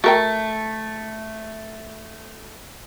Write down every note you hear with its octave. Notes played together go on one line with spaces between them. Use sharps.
A3 F#4 A#4 G5